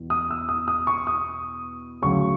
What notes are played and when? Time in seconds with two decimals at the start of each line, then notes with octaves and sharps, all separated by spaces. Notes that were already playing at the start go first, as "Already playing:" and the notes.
Already playing: E2 B2
0.10 D#6
0.31 E6
0.49 D#6
0.68 D#6
0.87 C#6
1.07 D#6
2.02 D2 C#3 F#3 C#6